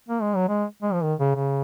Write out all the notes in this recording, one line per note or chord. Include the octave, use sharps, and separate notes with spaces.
A#3
G#3
F#3
G#3
G#3
F3
D#3
C#3
C#3